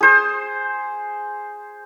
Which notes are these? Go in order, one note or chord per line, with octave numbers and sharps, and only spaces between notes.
G#4 C5